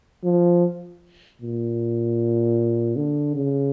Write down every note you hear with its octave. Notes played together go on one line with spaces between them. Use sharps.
F3
A#2
D3
C#3